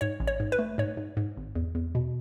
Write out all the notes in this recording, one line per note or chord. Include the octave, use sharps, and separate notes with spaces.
G#2 C#5
A1
C#5
G#2
B4
A3
G#2 C#5
G#2
G#2
G#1
E2
E2
B2